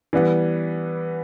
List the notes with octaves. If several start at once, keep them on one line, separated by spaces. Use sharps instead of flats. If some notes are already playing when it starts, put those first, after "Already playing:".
E3 G3 B3